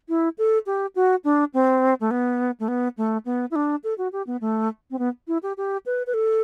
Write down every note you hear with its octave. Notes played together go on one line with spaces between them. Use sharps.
E4
A4
G4
F#4
D4
C4
A3
B3
A3
B3
A3
B3
E4
D4
A4
F#4
G4
B3
A3
C4
B3
E4
G4
G4
B4
B4
A4